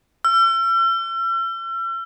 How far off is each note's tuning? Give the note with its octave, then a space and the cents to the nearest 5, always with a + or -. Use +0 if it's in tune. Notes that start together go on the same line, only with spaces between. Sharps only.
E6 +45